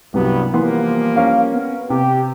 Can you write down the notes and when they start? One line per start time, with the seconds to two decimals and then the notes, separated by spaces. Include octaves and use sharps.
0.14 C2 G2 C3 F#3 B3
0.54 E3 F3 G3 A#3 B3 C6
1.16 C#4 A#4 F5
1.54 B3
1.90 C3 G4